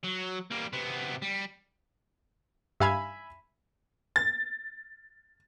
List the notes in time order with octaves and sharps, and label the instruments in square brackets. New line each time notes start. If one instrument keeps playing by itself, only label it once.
[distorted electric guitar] F#3
G3 A#3
C3 B3
G3
[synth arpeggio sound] G2 F5 G#6 [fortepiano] E5 G#5 B5
[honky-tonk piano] A6